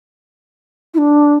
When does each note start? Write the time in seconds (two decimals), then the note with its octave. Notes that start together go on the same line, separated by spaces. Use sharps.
0.94 E4
0.98 D4